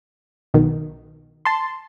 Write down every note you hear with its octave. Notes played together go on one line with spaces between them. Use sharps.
B1 B2 D#3
A5 C6